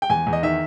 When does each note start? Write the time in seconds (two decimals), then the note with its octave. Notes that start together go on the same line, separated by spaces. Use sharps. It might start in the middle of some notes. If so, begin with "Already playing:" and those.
0.02 G5
0.10 E2 G#5
0.27 E2
0.33 D#5
0.43 D#3 E5